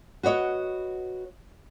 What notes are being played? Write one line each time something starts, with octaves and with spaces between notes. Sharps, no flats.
F#4 B4 C#5 D#5